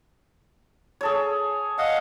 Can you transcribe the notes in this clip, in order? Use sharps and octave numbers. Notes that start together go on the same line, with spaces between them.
G#4 A4 C#5
D#5 F5 F#5